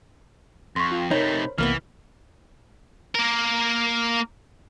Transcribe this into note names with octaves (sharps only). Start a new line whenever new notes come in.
F2 C6 C#6
F4 F5 G5
C3 A3 D#4 A#4 C5 C#5 B5
B1 E2 C3 E3 A#3 B3 F6
A#3 A#4